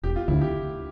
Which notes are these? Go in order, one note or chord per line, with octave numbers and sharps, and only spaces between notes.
E1 G4
F4
D2 D3 E4
G4